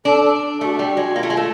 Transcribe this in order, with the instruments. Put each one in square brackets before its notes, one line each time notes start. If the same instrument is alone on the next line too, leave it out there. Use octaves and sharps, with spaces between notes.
[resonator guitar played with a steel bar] D4 [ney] A4
[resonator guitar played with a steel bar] A3 [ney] F#4 A4
[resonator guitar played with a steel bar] G3
G#3
[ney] F#4
[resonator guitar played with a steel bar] A#3 [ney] F4
[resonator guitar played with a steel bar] A3
G#3
A3